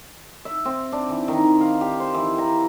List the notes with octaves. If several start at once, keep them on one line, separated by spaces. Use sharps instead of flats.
E5
C4
D4
E3
D#3
F5
G4
C5
E3
A#5